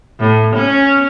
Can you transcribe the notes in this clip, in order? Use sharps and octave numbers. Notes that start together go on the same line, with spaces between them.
A2
C#4